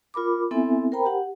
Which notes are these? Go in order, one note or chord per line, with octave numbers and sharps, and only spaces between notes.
F4 A#4 B5 D6
B3 C4 E4 A4 E5 G#5
A#4 C5 G5 A#5 B5
G4 F#5